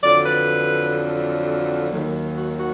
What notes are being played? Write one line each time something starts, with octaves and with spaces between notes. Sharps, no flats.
F2 D3 F#3 D5
B4
D#2 D#3 F#3
F#4
F#4